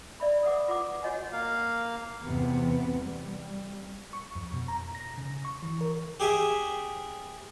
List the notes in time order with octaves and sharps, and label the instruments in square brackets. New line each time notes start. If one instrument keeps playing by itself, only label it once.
[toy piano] D5 E5 B5
A4 B4 F#5 D6
F4 B4 F#5 D6
F#4 C#5 D#5 F#5 G#5
[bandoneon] A#3 F5
[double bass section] E2 C3 B3 C4
G3
[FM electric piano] C#6
F2
B2
A#5
A#6
C#3
C#6
E3
A#4
[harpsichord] G4 G#4 E5